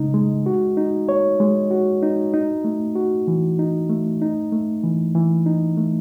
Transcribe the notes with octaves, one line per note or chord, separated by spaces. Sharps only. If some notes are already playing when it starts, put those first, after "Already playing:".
Already playing: C#3 G#3 D#4
G#3
F#4
D#4
C#5
G#3
F#4
D#4
D#4
A3
F#4
E3
D#4
A3
D#4
A3
E3
E3
D#4
A3